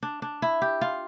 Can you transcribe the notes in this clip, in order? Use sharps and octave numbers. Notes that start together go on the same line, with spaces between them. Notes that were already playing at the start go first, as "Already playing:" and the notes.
D4
D4
E4
G4
F4